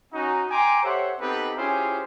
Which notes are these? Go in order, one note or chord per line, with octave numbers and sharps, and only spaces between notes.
C#4 D#4 F#4
G5 G#5 A#5 C6 D6
G4 A4 C5 C#5 E5 F#5
B3 C4 D#4 G4 A4 B4
C#4 E4 F4 G4 G#4 C5